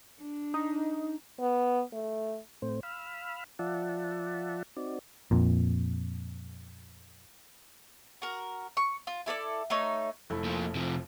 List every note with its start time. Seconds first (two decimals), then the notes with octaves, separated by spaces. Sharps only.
0.20 D4
0.54 D#4
1.40 B3
1.93 A3
2.62 A2 A3 C4 C5
2.83 F5 B5 E6 F6
3.59 F3 F4 D5 E5 F#5 A5
4.77 C4 D#4 F#4 D5
5.31 F2 A#2
8.22 F#4 A#4
8.77 C#6
9.07 F4
9.26 E4 A4 C#5 D5
9.70 A3 D#4 C#5
10.30 F1 A3 E4
10.45 A#2 F3
10.75 C3 F3